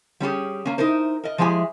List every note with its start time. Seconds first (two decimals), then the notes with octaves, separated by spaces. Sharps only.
0.20 G3 C#4 G4 G#4
0.65 A#3 C#4
0.78 D#4 E4 A#4 C5
1.24 A#4 D#5
1.38 F3 G#3 E4 G4 G#5